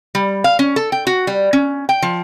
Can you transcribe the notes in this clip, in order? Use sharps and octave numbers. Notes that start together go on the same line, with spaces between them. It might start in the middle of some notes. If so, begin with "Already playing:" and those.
G3
F5
C#4
A4
G5
F#4
G3
C#4
G5
F3